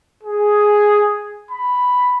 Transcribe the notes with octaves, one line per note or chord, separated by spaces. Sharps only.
G#4
B5